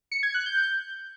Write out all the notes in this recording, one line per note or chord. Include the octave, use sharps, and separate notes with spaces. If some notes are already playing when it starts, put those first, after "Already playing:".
C#7
G#6
F#6
G6